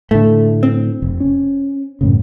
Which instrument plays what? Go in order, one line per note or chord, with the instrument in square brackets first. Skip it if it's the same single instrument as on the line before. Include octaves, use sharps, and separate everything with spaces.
[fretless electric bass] A2 D3 [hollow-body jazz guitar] A3
[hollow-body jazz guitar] C4
[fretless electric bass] F1
C#4
F#2 A2 C#3